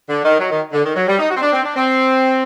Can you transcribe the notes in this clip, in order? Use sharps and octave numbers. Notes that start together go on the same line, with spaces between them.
D3
D#3
F#3
D#3
D3
D#3
F#3
G3
D#4
F#4
C4
D4
C4
D4
C4